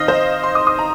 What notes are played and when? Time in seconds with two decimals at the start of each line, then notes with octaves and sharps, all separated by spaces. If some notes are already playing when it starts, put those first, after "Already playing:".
Already playing: D#3 C4 D#4 D#5 F5
0.08 C5
0.43 C6
0.55 D#6
0.67 D#6
0.79 A#5